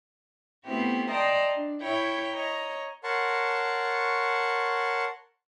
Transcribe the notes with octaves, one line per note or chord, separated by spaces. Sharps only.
A3 B3 C4 E4 F#4 G4
D5 D#5 G5 A5 A#5 C6
D4
E4 C#5 G5 B5
C#5 D#5 A#5
A#4 C#5 F#5 A5 C6 C#6